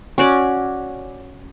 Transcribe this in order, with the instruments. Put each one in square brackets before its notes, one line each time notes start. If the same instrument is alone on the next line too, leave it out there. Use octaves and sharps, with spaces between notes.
[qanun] C#4 F#4 D5